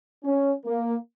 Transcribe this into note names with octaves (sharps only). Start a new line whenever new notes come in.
C#4
A#3